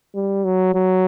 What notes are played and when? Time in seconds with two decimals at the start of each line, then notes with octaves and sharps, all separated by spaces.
0.15 G3
0.45 F#3
0.74 F#3